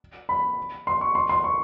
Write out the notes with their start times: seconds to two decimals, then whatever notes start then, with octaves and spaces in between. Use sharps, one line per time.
0.29 B5
0.87 C6
1.01 C#6
1.15 C6
1.29 C6
1.44 C#6